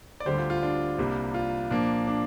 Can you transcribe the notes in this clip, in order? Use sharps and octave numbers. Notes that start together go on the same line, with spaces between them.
D5
D2 D3 G3 G4 C5
F4
F4
D4
C2 C3 G3 A#3
F4
A#2 F3 A#3 D4
D4